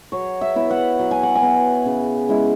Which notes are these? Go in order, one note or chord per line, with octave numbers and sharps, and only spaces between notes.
F#3 C#5
E5
B3 E4
F#5
F#3
G#5
F#5
G#5
B3 E4
C#3
G#3 C#4 E4